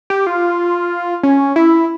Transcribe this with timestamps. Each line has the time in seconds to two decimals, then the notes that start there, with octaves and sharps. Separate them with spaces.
0.10 G4
0.27 F4
1.23 C#4
1.56 E4